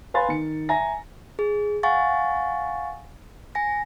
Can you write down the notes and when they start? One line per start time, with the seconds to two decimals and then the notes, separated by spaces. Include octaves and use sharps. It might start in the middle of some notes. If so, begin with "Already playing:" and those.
0.14 B4 F5 G#5 B5 C6 A6
0.28 D#3 C#7
0.69 E5 G#5 A#5 A#6
1.39 G#4
1.83 F5 F#5 G#5 C#6 A6
3.55 G#5 A#6